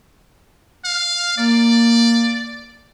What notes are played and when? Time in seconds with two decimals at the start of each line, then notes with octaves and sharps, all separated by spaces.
0.85 F5
1.38 A#3 D5